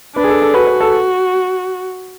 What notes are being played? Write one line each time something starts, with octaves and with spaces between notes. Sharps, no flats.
D4 B4
G#4
A4
A4
F#4 B4
B4
A4